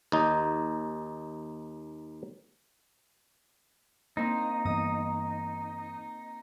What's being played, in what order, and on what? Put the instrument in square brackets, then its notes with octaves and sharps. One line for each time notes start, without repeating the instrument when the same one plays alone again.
[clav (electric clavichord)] D#2 D#4
[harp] A#3 C4 D4 [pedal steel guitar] D#4
[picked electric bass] G2 E3 B3 [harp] D#6